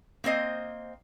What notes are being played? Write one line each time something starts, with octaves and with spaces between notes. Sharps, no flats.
A#3 C4 C5 D#5